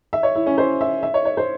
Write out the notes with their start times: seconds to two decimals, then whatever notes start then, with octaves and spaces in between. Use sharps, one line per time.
0.13 E5
0.23 C#5
0.35 E4
0.46 C#4
0.58 C5
0.81 E5
1.03 E5
1.14 C#5
1.25 C#5
1.37 C5